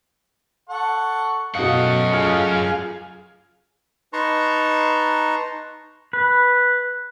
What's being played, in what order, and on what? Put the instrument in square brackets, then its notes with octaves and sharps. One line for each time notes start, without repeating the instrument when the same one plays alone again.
[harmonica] A4 F#5 C#6
[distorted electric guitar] F#2 F#5 [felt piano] B2 F5 [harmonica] A3 D#5
[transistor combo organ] F4 G#4 [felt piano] F5 F6
[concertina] D#4 B4 A5 A#5 C6 C#6
[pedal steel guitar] B4